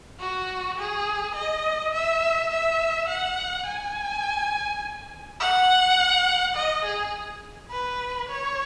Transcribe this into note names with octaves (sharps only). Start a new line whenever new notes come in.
F#4
G#4
D#5
E5
E5
F#5
G#5
F#5
D#5
G#4
B4
C#5